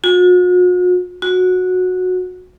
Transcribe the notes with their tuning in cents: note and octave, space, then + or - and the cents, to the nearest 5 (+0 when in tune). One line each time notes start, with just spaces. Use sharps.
F#4 -45
F#4 -15